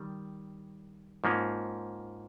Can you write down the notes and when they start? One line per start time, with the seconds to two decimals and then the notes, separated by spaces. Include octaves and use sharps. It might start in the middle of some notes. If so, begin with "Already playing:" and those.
Already playing: D#3 G3
1.24 G#2 F3 A#3 C#4